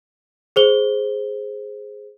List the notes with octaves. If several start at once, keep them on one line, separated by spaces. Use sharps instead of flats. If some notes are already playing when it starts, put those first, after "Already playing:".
G#4 C5 G7